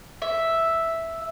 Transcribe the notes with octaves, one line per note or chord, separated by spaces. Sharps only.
E5